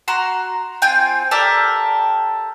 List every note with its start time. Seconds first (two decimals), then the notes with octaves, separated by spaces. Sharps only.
0.08 F#4 A#5 C6
0.82 C4 F4 G5 G#5
1.31 G4 A4 A#4 D5